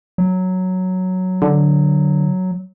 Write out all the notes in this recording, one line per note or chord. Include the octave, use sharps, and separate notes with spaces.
F#3
D3